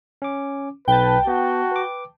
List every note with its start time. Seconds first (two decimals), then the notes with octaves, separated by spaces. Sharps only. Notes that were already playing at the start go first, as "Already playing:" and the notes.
0.22 C#4 D6
0.88 B1 B4 G5 A5
1.27 B3 F#4
1.72 B4 D6